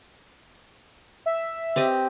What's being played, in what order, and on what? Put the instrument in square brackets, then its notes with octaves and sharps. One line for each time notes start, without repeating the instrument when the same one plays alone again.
[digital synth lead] E5
[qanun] C4 G4 D#5